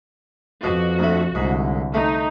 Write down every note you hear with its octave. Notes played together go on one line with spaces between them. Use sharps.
F2 B2 F#4 D6
D2 A3
C2 G#2 D3
A3 D#4